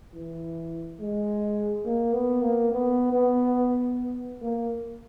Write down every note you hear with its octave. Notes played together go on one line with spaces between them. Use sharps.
E3
G#3
A#3
B3
A#3
B3
B3
A#3